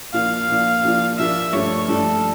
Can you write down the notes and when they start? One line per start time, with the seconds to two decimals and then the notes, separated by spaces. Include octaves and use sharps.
0.13 A#2 F3 A#3 D4 F4 F5
0.49 A#2 F3 A#3 D4 F4
0.83 A#2 F3 A#3 D4 F4
1.18 A#2 F3 A#3 D4 F4 E5
1.53 G2 F3 A3 D4 C#5
1.88 G2 F3 A3 D4 A4